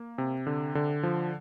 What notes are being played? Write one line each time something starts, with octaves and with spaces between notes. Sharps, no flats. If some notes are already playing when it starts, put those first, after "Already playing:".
Already playing: A#3
C3
D3
D3
F3